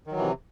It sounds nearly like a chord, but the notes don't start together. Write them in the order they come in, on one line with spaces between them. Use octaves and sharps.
D#3 F#3 E3 C3